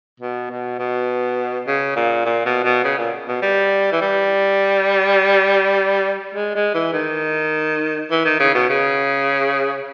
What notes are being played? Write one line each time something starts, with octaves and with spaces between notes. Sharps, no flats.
B2
B2
B2
C#3
A#2
A#2
B2
B2
C#3
A#2
B2
G3
E3
G3
G#3
G#3
E3
D#3
E3
D#3
C#3
B2
C#3